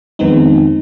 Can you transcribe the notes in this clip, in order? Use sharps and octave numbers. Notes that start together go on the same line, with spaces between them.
F2 D#3 G#3 B3 C4 D#4